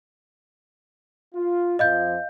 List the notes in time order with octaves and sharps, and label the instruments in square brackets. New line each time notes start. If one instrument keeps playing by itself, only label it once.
[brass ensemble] F4
[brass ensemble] F2 F3 [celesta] D#5 F5 G6